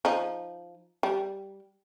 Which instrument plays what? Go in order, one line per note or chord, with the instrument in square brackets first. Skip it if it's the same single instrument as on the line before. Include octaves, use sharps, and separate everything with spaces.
[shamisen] F3 D#4
G3